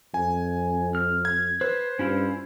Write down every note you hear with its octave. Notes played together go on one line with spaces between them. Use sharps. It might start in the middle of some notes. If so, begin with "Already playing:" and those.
F2 G#5
F6
G#6
B4 C5
G2 C#4 E4 F4